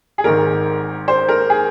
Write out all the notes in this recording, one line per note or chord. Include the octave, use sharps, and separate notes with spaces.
G#4
G#1 G#2 D#3 A#4
C5
A#4
G#4